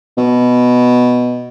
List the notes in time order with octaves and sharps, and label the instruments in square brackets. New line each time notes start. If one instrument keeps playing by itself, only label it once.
[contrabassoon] B2